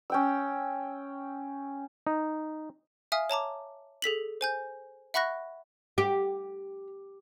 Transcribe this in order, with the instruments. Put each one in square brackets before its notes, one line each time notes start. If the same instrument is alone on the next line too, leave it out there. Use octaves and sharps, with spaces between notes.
[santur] C#4 G5 E6
[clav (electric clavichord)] D#4
[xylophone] E5 F5 G#5 D#6 F6
C#5 A5 A#5 D6
G#4 A4 B6 F#7
C5 G#5 G6
E5 F#5 B5 C#6 F#6 A#6
[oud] G4